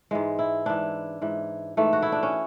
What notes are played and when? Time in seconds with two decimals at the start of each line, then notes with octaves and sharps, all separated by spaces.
0.11 G#2 E3 G#3
0.39 E4
0.66 G#2 E3 D4
1.22 G#2 E3
1.77 G#2 E3 A3
1.93 F#4
2.02 E4
2.12 D4
2.23 C#4